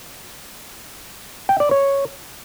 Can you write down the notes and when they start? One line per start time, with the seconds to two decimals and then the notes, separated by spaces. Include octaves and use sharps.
1.49 G5
1.60 D5
1.71 C#5